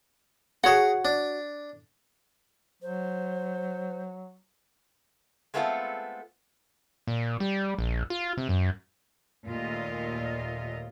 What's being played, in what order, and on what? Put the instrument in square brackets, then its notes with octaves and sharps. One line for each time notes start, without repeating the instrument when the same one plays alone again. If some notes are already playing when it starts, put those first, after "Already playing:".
[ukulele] F#4 C#5 F#5 [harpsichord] G#4 A#5
[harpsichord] D4
[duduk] F#3 [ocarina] C5
[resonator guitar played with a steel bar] G#3 A3 B3 C4 F4 A4
[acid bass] A#2
G3
A#1
F4
C3
F#2
[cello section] D#2 A#2 A3 F4 D#5